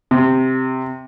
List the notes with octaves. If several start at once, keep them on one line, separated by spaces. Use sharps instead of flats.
C3